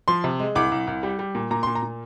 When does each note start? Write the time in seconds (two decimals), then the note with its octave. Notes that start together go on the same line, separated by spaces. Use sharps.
0.08 F3 C6
0.24 C3
0.40 G#3
0.55 C2 D6
0.72 C2
0.87 C2
1.03 G3
1.19 G3
1.35 A#2
1.51 A#2 A#5
1.63 A#2 C6
1.75 A#5
1.83 A#2